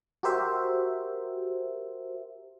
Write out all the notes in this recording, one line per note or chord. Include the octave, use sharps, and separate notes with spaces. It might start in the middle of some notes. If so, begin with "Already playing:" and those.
F#4 G4 A#4 C5 E5